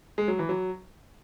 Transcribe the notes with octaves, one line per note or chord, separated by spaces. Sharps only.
G#3
F#3
E3
F#3